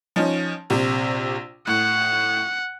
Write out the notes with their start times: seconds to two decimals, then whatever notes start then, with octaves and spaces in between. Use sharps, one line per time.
0.16 F3 C#4 D#4
0.70 A#1 C3
1.67 A2 F#5